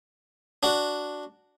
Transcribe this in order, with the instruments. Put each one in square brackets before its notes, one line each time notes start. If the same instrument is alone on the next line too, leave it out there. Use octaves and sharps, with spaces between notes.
[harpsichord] D4 F#4